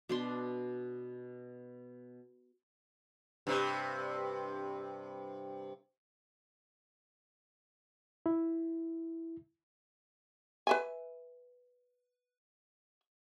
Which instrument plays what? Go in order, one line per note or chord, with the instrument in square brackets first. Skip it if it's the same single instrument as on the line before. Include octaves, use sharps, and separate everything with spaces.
[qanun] B2 D4 C6
[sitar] G2 C3
[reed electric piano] E4
[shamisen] B4 E5 G#5